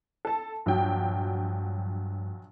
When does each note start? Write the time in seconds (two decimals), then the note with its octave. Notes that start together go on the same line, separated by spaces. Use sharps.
0.25 A4 A5
0.66 A#1 G2 F#3 G5